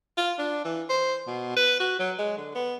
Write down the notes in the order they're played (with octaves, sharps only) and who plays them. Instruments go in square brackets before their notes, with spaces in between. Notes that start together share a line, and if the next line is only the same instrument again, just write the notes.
[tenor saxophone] F4
D4
E3
C5
B2
B4
F#4
F#3
G#3
D3
B3